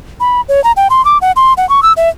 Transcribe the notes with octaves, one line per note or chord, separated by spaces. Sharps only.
B5
C#5
A#5
G5
C6
D6
F#5
C6
F#5
C#6
E6
E5